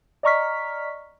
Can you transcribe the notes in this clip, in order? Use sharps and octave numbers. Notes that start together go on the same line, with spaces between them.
D5 D#5 A#5 C#6 F6 B6